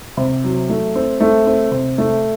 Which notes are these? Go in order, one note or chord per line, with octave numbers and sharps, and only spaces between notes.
C3
F#3
A3
C4
A3
C4
C3
A3